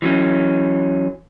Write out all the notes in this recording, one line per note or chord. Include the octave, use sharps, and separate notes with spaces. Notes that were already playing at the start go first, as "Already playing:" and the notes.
E3 F#3 C#4